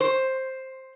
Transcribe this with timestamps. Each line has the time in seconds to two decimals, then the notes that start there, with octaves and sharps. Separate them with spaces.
0.01 C5